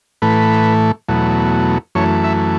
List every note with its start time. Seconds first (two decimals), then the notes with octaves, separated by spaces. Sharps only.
0.22 A2 E3 A3 B4
1.09 E2 B2 F#3 A3
1.95 F#2 E3 A3 C#5
2.24 E5